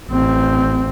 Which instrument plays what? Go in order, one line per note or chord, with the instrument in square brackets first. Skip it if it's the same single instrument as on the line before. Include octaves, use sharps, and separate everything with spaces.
[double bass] A1 C4